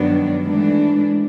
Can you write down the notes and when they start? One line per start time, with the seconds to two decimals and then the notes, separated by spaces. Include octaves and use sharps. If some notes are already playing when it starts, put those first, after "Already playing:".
Already playing: G2 D#3 F#3 B3 D4
0.44 G#2 E3 A3 D4